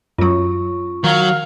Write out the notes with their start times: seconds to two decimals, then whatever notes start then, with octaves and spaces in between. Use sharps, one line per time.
0.18 F#2 F#3 F4 C#6
1.04 D#3 F#3 F5